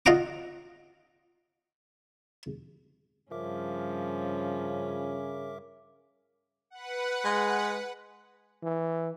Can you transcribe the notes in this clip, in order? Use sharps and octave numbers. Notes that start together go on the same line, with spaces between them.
F4 D#5 F5 F#5 A#5 D6
G2 C#3 F3 C#4 A#4 E5 D6
B4 F#5
G#3
E3